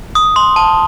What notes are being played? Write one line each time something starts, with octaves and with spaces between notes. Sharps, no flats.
D#6
C6
A5